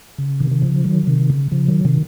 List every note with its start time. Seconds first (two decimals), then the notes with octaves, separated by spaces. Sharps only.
0.18 C#3
0.40 C3 D#3
0.51 D#3
0.62 C#3 F3
0.84 D#3 F#3
1.07 C3 D#3
1.30 C#3
1.51 C#3 F3
1.68 D#3 F#3
1.85 C3 D#3